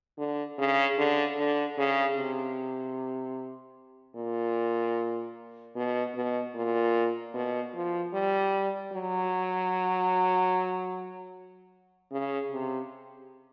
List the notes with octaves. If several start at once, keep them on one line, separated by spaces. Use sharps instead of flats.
D3
C#3
D3
D3
C#3
C3
A#2
B2
B2
A#2
B2
F3
G3
F#3
C#3
C3